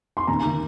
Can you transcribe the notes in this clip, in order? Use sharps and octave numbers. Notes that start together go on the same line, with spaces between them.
C6
D#2 A#5
D#3 A#3